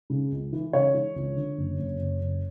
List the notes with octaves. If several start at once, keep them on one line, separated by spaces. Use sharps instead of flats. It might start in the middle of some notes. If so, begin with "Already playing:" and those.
C#3
C#2
E3
C#3 C#5
E3
C#2
D3
F#1
F#1
F#1
F#1